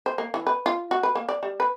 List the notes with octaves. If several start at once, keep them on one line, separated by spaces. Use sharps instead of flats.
C5
A#3
E3
B4
F4
F#4
B4
A#3
D5
G3
B4